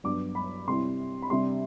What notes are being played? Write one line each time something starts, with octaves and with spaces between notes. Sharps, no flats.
G2 F#3 B3 D4 D6
B5
C3 G3 C4 E4 C6
B5
C3 G3 D4 C6